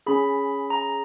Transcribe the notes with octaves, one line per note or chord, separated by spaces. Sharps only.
C#4 G#4 B5
A#5